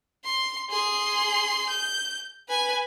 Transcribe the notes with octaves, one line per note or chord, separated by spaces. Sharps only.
C6
G#4 C6
G6
B4 G#5